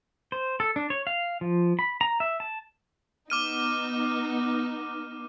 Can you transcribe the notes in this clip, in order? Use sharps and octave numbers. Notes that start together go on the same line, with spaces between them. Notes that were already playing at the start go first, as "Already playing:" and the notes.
C5
A4
D4
C#5
F5
F3
B5
A#5
E5
A5
B3 D#4 D6 F6 D#7